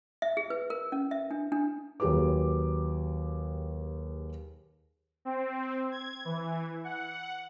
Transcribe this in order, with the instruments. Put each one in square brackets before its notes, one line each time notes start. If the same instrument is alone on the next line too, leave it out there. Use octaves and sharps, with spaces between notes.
[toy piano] E5
G#4
B4
A#4
C#4
E5
D4
D4
[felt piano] D#2 F#3 G4 G#4 B4 D6
[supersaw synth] C4
G#6
E3
F#5